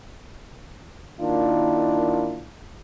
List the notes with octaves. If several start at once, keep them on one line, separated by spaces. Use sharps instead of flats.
D#3 A#3 D4 E4 F4